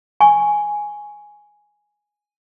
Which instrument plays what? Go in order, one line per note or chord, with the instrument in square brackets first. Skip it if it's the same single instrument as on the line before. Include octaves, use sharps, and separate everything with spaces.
[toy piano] G#5 C#6